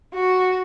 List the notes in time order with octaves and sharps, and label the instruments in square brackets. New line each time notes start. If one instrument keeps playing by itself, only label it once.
[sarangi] F#4